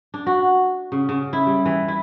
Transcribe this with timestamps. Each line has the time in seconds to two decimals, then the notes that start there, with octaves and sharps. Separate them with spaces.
0.14 D4
0.27 F#4
0.92 C#3
1.09 C#3
1.33 E4
1.46 G3
1.66 E3
1.88 E4